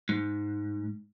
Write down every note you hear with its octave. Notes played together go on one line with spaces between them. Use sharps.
G#2